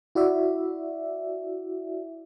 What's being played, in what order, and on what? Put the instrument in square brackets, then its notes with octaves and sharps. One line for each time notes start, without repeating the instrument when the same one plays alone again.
[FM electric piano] E4 F#4 D5 E5